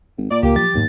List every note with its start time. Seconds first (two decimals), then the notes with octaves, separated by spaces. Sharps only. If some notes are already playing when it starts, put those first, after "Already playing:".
0.18 G#1
0.31 A#2 D5
0.43 C#2 A#3 G4
0.56 F3 F#3 A#3 A6
0.74 D#2 G#2 F#3 B3